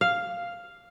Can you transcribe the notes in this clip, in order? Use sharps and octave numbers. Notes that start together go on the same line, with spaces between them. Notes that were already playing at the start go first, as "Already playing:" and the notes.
F5